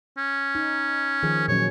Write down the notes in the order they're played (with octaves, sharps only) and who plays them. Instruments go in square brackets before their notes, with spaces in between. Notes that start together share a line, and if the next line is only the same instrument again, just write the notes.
[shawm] C#4
[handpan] D#4
D#3 F3 G#4
[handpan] A#2 F#3 C#4 [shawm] C#5